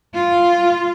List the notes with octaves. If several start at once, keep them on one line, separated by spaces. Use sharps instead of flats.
F4